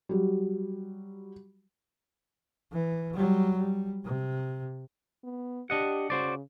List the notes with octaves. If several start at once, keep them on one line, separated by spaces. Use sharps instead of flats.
F#3 G3
E3
F#3 G3
G3
C3
B3
D4 G4 D#5 F#5
C#3 F#4 C5 D5